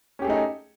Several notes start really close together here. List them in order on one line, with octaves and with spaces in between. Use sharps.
C#4 G4 G#4 A3 D#4